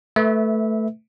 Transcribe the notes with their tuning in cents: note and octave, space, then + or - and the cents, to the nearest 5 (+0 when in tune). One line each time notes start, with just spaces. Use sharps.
A3 +0 B4 +0 E5 -20